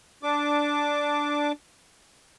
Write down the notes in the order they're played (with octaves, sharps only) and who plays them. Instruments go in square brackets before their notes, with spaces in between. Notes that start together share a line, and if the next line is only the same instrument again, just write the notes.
[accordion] D4 D6